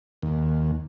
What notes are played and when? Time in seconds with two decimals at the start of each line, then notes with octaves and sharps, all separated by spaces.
0.22 D#2